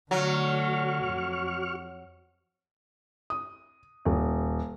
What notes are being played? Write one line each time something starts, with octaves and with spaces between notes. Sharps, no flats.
D3 F#3 A3 F#4 C#6 F6
F2
D#6
D#1